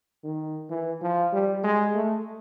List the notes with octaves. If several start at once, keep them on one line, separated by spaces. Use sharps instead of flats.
D#3
E3
F3
G3
G#3
A3